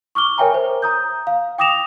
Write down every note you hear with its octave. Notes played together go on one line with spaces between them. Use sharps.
C#6 D6 F6 G7
A#4 C#5 E5 G5 G#5 A#5
C5
A#5 D#6 G6
F5
G5 D6 D#6 A#6 E7 F7